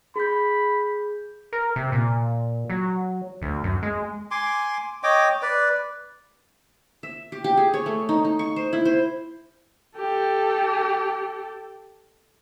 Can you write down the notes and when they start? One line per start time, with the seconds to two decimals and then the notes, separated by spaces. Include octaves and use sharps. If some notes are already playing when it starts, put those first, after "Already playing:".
0.16 G#4 B5 G6
1.53 A#4
1.76 C3
1.92 A#2
2.70 F#3
3.42 D2
3.64 F#2
3.83 G#3
4.31 G#5 C6 D6
5.03 C#5 D#5 G5 D6
5.42 B4 D5
7.03 E5
7.32 G4
7.44 G4
7.57 G#4
7.74 C#5
7.86 A3
8.09 D#4
8.25 D#4
8.39 C#6
8.56 C5
8.73 E4
8.85 C5
9.98 G4 A4